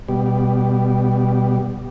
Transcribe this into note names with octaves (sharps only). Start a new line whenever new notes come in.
B2 G3